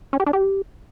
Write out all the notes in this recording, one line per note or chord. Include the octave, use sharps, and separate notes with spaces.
C#4
G4
D4
G4